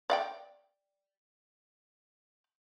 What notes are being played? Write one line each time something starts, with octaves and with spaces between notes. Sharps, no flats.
D5 F5 G5